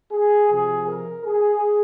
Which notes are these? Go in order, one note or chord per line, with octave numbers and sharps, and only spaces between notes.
G#4
C3 F3 G#4
A#4
G#4